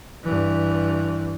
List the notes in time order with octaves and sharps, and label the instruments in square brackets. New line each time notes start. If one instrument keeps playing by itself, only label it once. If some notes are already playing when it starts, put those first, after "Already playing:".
[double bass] G2 E3